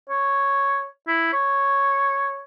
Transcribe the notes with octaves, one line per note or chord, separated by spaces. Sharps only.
C#5
E4
C#5